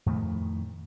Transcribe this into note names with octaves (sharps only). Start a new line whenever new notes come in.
F2 A2 D#3 A3